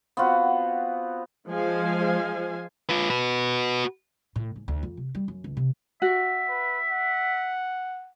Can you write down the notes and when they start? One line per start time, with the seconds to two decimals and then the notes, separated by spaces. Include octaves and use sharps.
0.17 B3 C4 F4 F#4
1.49 F3 G#3 C5 F5 G#5
2.89 F4 B4
3.10 F#4 B4
4.36 A2
4.56 G#2
4.68 D2
4.83 F2
4.97 C3
5.15 G3
5.28 F#2
5.44 C#2
5.57 C3
6.02 F#4 E5
6.49 B4
6.90 F#5